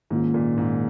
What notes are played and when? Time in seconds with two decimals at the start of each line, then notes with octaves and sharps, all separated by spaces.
0.11 G#2 D#3 A#3 C#4 F4
0.34 A#2
0.58 G#2